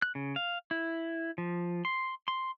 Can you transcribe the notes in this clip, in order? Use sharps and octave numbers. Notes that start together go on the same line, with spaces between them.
F#6
C#3
F5
E4
F3
C6
C6